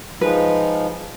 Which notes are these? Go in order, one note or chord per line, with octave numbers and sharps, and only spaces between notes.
F3 G#3 D#4 B4